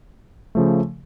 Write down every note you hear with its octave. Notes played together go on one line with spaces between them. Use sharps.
C#3 F3 A3